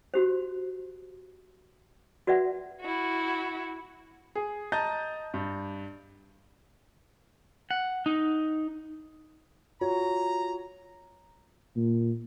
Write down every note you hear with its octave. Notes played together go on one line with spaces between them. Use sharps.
F#4 G4 C5
F#4 B4 D5 E5 F#5
E4 F#4
G#4
D#5 A5 A#5 G6 A6
G2
F#5
D#4
F4 F#4 C#5 A#5
A#2